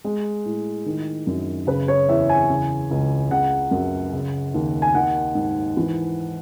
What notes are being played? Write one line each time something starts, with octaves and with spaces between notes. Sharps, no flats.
G#3
A2
D#3
F#2
C#3 B4
C#5
E2 E5
G#5
C#3
C#2
C#3 F#5
F#2
C#3
D#2
G#5
D#3 F#5
G#2
E3